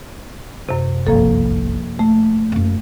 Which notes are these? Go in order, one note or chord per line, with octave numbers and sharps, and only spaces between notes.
F#2 C3
G1 C2 F3 A#3 A4
A3 A#3
F#2 A#3